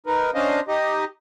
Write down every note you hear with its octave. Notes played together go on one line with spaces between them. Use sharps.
D#4 A#4 B4
C#4 D4 C5 D#5 F5
D#4 G4 D#5